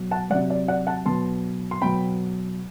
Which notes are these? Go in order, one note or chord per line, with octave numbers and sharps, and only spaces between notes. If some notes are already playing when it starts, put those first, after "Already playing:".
Already playing: B2 F#3
F#5 A5
C3 F#3 D5 F#5
D5
D5 F#5
F#5 A5
B2 F#3 A5 C6
C6
B2 F#3 G5 B5